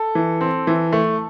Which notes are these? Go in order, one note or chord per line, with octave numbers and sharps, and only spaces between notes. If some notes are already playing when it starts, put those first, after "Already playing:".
Already playing: A4
E3
C4
E3
A3